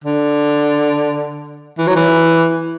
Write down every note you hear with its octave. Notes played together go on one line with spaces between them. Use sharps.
D3
E3
F#3
E3